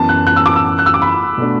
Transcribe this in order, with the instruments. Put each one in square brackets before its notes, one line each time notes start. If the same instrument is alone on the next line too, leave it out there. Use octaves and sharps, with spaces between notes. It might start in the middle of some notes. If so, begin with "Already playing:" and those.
Already playing: [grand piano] F#2 E3 B3 [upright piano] A5
[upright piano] F#6
F#6
E6
D6
E6
F#6
E6
D6
B5
[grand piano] B2 A3 D4